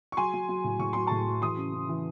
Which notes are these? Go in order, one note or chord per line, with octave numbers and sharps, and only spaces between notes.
C#6
F#3 G#5 C6
F#3
F#3
A2
A2 C#6
F#3 C6
A2 A5 C#6
F#3
E3 C6 D#6
C#3
C#3
E3